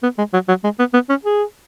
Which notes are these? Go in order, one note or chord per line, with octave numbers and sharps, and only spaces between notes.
B3
G#3
F#3
F#3
G#3
B3
B3
C#4
G#4